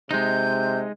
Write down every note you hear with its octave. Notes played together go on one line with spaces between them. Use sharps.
C3 G#3 D#4 G6